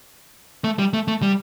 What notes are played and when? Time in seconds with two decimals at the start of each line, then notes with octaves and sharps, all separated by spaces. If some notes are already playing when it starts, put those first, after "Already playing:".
0.64 A3
0.79 G3
0.93 A3
1.08 A3
1.22 G3